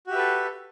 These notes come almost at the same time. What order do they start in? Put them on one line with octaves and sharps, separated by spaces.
F#4 G4 E5 B4 A4